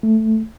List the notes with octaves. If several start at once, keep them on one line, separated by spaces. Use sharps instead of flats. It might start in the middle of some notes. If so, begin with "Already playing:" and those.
A3